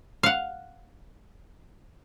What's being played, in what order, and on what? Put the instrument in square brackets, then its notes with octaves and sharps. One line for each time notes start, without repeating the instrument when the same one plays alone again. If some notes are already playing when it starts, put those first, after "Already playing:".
[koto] F5 F#5